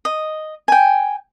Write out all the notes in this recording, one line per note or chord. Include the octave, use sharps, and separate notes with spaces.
D#5
G5 G#5